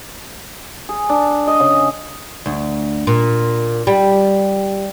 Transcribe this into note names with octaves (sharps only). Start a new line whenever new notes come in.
G#4
D4
D#5
C#3
D2
A#2
G3